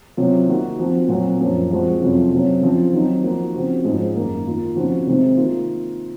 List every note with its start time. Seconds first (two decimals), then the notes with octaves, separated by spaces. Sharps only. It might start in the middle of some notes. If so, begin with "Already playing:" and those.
0.17 C3 F#3 C#4 F4
0.47 D#3 A#3 D#4 F#4
0.79 F3 C4 F#4
1.08 A#2 F#3 C4 F#4
1.39 F#2 F3 A#3 C#4
1.70 F3 G#3 C4 F#4
2.01 F2 C3 F#3 C#4 F4
2.31 C3 F#3 C#4
2.61 C#3 F3 C4 F4
2.93 D#3 F#3 C4 D#4
3.22 F3 A#3 D#4 F#4
3.54 C#3 F3 C4 F#4
3.84 G#2 F3 G#3 C#4 F4
4.15 F#2 D#3 A#3
4.46 D#3 A#3 F4
4.76 C#3 F3 C4 D#4 F#4
5.07 C3 D#3 G#3 C4
5.37 D#3 A#3 F4